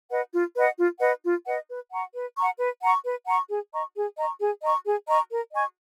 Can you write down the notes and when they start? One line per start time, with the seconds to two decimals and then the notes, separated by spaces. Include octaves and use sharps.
0.11 B4 D#5 F#5
0.33 F4
0.55 B4 D#5 F#5
0.78 F4
1.01 B4 D#5 F#5
1.24 F4
1.46 B4 D#5 F#5
1.69 B4
1.92 F#5 A#5 C#6
2.14 B4
2.36 F#5 A#5 C#6
2.59 B4
2.82 F#5 A#5 C#6
3.04 B4
3.27 F#5 A#5 C#6
3.49 G#4
3.72 D#5 A#5 C#6
3.95 G#4
4.17 D#5 A#5 C#6
4.40 G#4
4.62 D#5 A#5 C#6
4.86 G#4
5.08 D#5 A#5 C#6
5.31 A#4
5.53 D#5 G#5 C#6